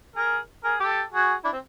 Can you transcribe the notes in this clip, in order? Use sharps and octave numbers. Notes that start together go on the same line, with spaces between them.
G#4 A#4
G#4 A#4
G4 A4
F#4 G#4
D4 E4
C4